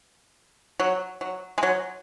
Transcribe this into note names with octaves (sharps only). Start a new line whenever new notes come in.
F#3
F#3
G#3
F#3